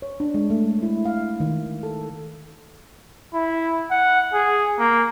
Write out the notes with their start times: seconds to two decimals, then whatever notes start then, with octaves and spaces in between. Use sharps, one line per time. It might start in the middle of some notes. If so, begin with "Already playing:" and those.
0.02 C#5
0.20 D4
0.34 G#3
0.50 A3
0.82 E4
1.06 F5
1.40 D#3
1.83 A4
3.34 E4
3.91 F#5
4.34 G#4
4.79 A#3